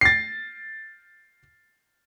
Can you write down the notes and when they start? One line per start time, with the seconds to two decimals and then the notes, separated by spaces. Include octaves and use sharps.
0.01 A6 C7